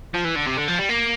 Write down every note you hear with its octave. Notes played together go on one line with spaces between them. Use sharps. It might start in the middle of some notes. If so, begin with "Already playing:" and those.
F3
E3
D3
C3
D3
F3
G3
A#3